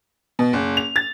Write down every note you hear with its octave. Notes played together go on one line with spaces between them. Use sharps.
B2
F#1
F7
A6